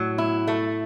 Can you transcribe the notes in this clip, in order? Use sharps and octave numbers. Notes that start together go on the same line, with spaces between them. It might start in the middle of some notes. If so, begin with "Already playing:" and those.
Already playing: A2 F#3
E4
A3